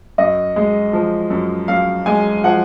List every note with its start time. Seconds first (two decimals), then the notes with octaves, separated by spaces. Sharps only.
0.18 F#2 D#5
0.56 G#3
0.93 F3
1.30 F#2
1.68 F#2 F5
2.06 G#3 G#5
2.44 F3 F#5